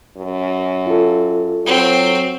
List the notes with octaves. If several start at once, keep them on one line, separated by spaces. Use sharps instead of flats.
F#2
F4 A4
F#3 C4